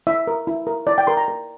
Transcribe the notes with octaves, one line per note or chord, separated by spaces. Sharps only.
E4 E5
A#4
E4
A#4
E4 D5
G5
A#4 C6
A#5
A#4